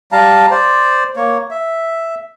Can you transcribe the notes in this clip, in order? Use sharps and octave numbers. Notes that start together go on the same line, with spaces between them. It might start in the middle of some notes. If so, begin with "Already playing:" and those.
G3 F5 A5 A#5
C5 D5
A#3 C#5
E5